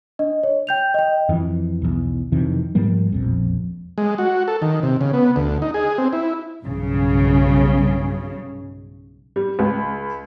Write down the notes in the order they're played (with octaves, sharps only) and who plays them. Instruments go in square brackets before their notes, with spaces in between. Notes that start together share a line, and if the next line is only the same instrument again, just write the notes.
[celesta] D4 D#5
C#5
G5 G6 F7
D#5 G5
[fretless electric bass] F2 E3
B1 E2
F2 C3 D#3 E3
G#2 F3 G3 A#3
E1 A#1 F2
[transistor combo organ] G#3
F#4
A4
D#3
C3
C#3
B3
D2
D#4
G#4
C4
E4
[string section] B1 G2 C#3
[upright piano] G3
C#2